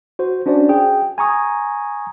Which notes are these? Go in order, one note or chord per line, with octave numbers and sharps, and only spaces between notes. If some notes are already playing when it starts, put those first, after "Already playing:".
F#4 C5
C#4 D4 F#4 C5 D5
G#4 G5
G#5 A#5 C#6 D#6